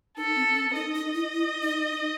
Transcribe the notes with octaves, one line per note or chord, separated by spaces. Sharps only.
D#4 A4
C4
C#4
D#4 D#5
D#4
E4
E4
D#4
D#4